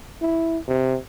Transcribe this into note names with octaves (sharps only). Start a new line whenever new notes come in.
E4
C3